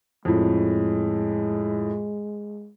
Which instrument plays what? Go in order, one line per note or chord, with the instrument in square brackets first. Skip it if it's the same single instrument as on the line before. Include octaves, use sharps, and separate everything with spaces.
[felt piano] F2 A2 [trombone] G#3